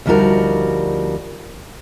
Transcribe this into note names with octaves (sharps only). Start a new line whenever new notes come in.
D2 F3 G3 D#4 F#4 A#4